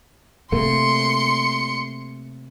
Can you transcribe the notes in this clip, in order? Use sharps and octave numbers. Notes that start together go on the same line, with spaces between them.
C3 A3 A#3 C6 C#7